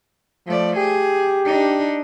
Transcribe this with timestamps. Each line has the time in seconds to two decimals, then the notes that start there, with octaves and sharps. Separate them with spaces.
0.47 F3 A3 D5
0.76 G4 G#4
1.45 D4 D#4